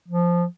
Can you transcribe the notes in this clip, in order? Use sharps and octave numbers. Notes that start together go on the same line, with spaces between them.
F3